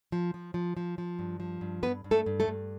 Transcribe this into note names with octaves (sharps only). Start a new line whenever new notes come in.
F3
F3
F3
F3
F3
G2
F3
G2
G2 B3 B4
G2
A3 A4
G2
A3 A4
G2